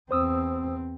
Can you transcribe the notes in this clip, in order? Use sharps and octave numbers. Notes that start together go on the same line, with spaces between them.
E2 C4 C5 D#6 E6